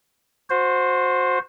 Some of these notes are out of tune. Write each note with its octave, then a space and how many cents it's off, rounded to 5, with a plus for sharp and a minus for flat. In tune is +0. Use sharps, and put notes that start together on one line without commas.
F#4 -25 C5 +0